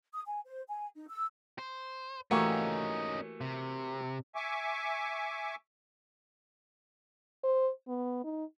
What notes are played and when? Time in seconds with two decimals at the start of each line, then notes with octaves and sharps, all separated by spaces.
0.13 D#6
0.26 G#5
0.45 C5
0.68 G#5
0.95 D#4
1.09 E6
1.58 C5
2.31 E3 A3 A#3 C#4 D#4 F#4 G4
3.41 C3
4.35 E5 G#5 C#6 D6
7.43 C5
7.88 B3
8.24 D#4